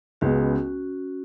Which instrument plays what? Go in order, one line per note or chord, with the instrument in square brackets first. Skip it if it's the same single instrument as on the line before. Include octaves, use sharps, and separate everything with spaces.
[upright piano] C#2 C#3 G#3 B3 [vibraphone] C#4 F#4